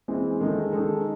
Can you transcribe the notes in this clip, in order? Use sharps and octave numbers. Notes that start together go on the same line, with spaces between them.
E3 G#3 C4
D#3 G#3 D#4 A4
D#3 G#3 D#4 A4